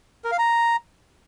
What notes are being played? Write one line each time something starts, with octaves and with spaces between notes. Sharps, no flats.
A#4
F5
A#5